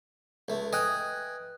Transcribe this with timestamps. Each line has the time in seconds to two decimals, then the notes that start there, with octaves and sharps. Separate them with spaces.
0.48 C#2 A3
0.73 B4 D#5 G5 G#5 F#6